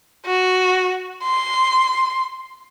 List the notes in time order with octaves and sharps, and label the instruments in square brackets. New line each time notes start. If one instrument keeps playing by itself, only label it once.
[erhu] F#4
C6